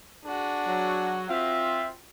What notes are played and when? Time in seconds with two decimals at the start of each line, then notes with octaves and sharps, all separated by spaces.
0.24 D4 F#4 G#4
0.68 F#3
1.29 C4 F4 E5